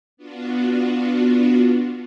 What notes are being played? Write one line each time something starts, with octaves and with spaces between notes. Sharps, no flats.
B3 D4 F4 F#4